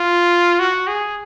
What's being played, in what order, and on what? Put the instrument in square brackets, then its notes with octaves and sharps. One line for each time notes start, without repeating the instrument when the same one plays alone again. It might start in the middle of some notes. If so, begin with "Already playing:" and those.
Already playing: [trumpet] F4
F#4
G#4